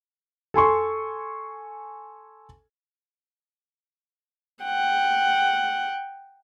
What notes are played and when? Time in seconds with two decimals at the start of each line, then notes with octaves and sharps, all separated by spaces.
0.54 A4 G#5 C6 C#6
4.63 F#5 G5